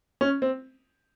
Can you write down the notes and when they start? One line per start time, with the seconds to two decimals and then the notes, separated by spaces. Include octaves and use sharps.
0.21 C#4
0.42 C4